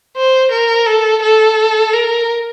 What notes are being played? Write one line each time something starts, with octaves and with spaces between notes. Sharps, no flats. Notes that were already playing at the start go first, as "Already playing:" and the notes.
C5
A#4
A4
A4
A#4